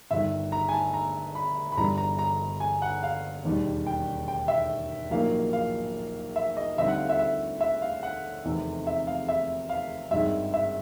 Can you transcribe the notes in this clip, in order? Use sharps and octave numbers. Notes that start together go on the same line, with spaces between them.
G1 G2 D#3 E5
A#5
G#5
A5
A#5
B5
B5
G1 G2 E3 G3 A#5
A#5
A#5
G#5
F#5
F5
E1 D#2 D#3 G3
G5
G5
E5
A#1 G#2 D#3 F#3 A#3 F5
F5
E5
D#5
D2 D3 G3 C4 D#4 E5
F#5
F5
E5
E5
E5
F5
F#5
F1 E2 C3 D#3
E5
F5
E5
F5
G#1 G2 D#3 G#3 E5
E5